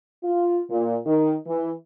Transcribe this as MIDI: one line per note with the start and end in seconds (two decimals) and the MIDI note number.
0.23 0.60 65
0.69 0.95 46
1.06 1.33 51
1.47 1.71 52